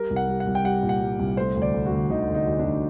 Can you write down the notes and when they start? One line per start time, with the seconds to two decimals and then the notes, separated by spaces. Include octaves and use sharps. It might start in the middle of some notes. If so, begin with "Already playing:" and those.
Already playing: G3 A#4
0.10 C2
0.16 F#5
0.28 G3
0.40 F#5
0.46 C2
0.55 G5
0.64 G3 F#5
0.83 A#2
0.89 F#5
1.01 G3
1.19 C2
1.37 A3 C5
1.56 D2
1.62 D5
1.74 D3
1.86 F#4
1.92 D2
2.10 D3 D#4
2.28 D2
2.35 D#4
2.46 D2
2.59 D4
2.65 D2